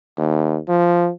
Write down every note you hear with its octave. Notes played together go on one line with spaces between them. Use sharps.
D#2
F3